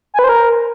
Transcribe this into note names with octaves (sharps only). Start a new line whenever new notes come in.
G#5
B4
C5
A#4